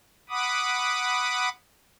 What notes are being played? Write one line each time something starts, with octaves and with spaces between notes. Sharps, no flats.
F#5 B5 D6 D#6